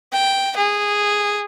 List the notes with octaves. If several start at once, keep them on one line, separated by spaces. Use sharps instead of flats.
G5
G#4